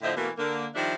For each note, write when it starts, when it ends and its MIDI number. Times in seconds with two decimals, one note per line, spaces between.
0.03 0.12 45
0.03 0.12 50
0.03 0.12 53
0.03 0.12 72
0.03 0.12 75
0.03 0.12 76
0.16 0.30 47
0.16 0.30 52
0.16 0.30 57
0.16 0.30 58
0.38 0.67 50
0.38 0.67 58
0.75 0.94 51
0.75 0.94 53
0.75 0.94 55
0.75 0.94 62
0.75 0.94 76